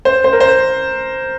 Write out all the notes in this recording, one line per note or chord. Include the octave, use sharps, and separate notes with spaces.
C5
C5
A#4
C5